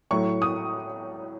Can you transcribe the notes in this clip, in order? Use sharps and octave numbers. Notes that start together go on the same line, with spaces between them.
A2 F#3 A3 C#6
D#6